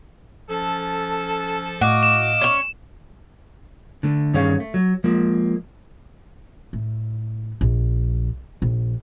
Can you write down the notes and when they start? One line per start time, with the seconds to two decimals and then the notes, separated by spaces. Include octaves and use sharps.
0.48 F3 C#4 A4
1.81 A2 F#4 D#5 F5 D6
2.03 E7
2.41 C#4 C#5
4.03 D3 A3
4.34 G2 D#3 C#4 G#4 C#5 F5
4.60 A3
4.74 F#3
5.04 F3 G#3 A#3
6.73 A2
7.61 A#1
8.62 A#1